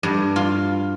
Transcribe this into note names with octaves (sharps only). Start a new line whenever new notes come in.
G2
F4